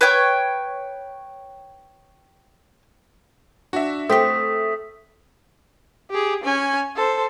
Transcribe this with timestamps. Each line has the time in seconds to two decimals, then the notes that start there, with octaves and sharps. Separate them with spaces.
0.01 B4 C#5 G5 C#6
3.73 D4 F#4 E5
4.09 A3 C4 G4 D#6 B6
6.10 G4 G#4
6.44 C#4 G#5
6.96 A4 C5